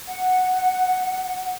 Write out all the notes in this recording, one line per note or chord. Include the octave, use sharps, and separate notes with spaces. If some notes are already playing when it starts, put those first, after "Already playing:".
F#5